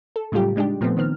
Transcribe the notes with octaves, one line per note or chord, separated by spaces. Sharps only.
A4
A2 C#3 F#3 G3 F4 G4
G3 G#3 D4 D#4 G4
A#2 F3 A3 B3 C4
D#3 B3 C4 F6